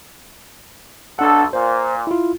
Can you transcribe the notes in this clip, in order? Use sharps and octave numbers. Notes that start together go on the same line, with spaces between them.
B1 D4 A4 F#5
A#2 C5
E4 F4